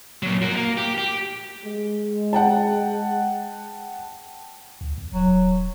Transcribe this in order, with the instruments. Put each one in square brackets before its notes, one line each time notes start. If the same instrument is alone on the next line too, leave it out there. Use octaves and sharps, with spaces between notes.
[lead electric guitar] A#2 F#3
F#4 A#4
A#3
G4
G4
[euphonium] G#3
[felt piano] F#5 G5 A5
[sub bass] D2
E2
[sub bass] D#1 [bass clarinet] F#3